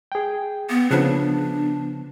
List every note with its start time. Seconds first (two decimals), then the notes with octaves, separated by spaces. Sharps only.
0.12 G#4 G5
0.70 B3
0.91 C#3 F3 B3 D4